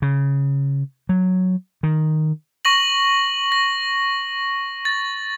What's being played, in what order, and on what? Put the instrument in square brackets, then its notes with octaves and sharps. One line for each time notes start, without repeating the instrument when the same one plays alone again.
[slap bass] C#3
F#3
D#3
[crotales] C#6 A#6 F#7
A#6
A6